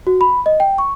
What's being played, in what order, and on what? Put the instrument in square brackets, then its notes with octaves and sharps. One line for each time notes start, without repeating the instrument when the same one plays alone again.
[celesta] F#4
B5
D#5
G5
C#6